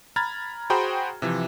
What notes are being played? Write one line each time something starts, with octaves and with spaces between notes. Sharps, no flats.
A#5 B5 F6 G#6 A6
F#4 G#4 C5 G5 A#5 B5
C3 E3 F3